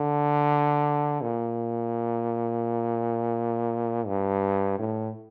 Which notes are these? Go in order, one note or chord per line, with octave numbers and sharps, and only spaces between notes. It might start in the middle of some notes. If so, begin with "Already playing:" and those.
Already playing: D3
A#2
G2
A2